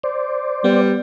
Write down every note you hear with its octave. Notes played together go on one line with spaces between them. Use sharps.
C5 D5
G3 B3